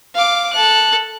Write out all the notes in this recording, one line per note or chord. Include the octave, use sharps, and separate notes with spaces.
F5 D6
A4 F#6